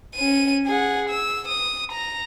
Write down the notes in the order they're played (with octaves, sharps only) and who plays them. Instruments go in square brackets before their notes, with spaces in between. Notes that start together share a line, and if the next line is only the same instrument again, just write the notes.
[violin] C#4 D#7
G#4 F#5
E6
D#6
A#5